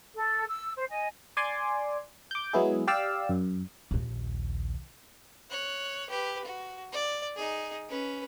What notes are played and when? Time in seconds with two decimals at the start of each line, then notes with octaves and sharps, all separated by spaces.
0.15 A4
0.49 E6
0.78 C5
0.90 D#5 G#5
1.37 D5 G#5 C6 D6
2.31 D6 G6
2.53 F#3 G#3 B3 E4 G#4
2.87 G4 D5 F5 E6
3.29 F#2
3.91 A#1 D#2
5.50 C#5 F#6
6.10 G4 B4
6.44 F#4
6.92 D5
7.36 D#4 G#4
7.89 C#4 B4